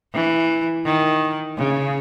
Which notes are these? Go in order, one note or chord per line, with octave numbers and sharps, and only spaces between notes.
E3
D#3
C#3